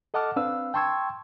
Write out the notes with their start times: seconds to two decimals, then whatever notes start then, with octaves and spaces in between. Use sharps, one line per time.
0.14 A4 D#5 F#5 A5 D6 F6
0.36 C4 D4 B4 F5 E6
0.74 G5 A5 C6 C#6 E6 G#6